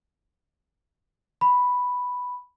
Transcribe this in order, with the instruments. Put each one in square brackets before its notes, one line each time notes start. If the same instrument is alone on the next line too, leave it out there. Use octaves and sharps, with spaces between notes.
[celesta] B5